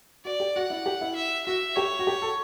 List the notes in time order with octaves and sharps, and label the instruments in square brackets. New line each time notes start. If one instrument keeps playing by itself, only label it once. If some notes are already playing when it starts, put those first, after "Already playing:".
[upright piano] F#4 [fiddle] D5
[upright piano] G4
[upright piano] F#4 [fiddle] F#5
[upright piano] E4
G4
E4
[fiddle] E5
[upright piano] F#4 [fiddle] E5
[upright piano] G4 [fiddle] C#5
[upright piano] F#4
G4
A4